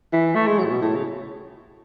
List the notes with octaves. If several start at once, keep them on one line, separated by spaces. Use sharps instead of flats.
E3
A3
G#3
F#3
A2
B2
A2
C#3